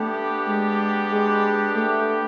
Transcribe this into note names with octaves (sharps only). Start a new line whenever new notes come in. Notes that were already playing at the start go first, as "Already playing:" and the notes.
Already playing: A3 B3 D4 G4
G#3
G#3
A3